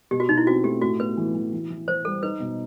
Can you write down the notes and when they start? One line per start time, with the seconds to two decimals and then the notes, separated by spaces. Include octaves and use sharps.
0.11 B2 G4
0.20 F#4
0.29 B2 D#4
0.37 E4
0.47 C4 F#4
0.64 A3 G4
0.82 A2 F#4
0.99 B3 B4
1.17 E3
1.35 E3
1.53 E3
1.70 E3
1.88 E3 C5
2.05 G3 A4
2.23 D#4 B4
2.40 B2